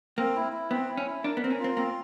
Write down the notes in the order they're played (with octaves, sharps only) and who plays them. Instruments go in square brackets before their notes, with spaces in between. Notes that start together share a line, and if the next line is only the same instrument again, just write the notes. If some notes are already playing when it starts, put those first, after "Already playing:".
[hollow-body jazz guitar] A#3 [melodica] C4
[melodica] E4
E4
[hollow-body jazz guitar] B3 [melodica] C4
[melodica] E4
[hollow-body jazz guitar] C#4
[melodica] E4
[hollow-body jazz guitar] D4 [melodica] A#4
[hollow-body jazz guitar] B3
[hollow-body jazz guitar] C4 [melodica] A#4
[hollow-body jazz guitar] C#4
[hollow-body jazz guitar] C4 [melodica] F4
[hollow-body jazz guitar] A#3 [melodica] C4